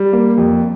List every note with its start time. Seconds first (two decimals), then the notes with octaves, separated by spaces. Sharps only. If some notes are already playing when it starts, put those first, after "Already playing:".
Already playing: G3
0.13 A#3
0.38 F2